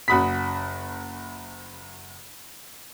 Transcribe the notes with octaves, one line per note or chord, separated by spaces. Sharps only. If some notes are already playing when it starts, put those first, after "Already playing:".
F#1 F#4 B5 D#6 B6